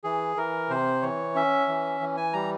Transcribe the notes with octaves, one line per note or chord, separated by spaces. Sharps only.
E3 G#4
E3 A#4
C3 C5
E3 C#5
C#4 E5
E3
E3
G#5
G3 A#5